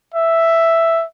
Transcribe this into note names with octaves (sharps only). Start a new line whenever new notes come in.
E5